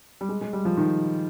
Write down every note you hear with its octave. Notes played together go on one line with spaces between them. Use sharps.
G3
G#3
G#3
G3
F3
D#3